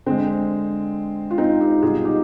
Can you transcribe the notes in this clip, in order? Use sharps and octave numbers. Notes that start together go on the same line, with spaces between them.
D3 G#3 C4
F4
C4 D#4
D#4 G4
B2 G3 F4 G#4
D#4 G4